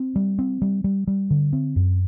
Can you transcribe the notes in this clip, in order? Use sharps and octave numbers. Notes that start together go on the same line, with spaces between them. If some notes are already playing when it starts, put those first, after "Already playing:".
Already playing: C4
G3
C4
G3
G3
G3
D3
C4
F#2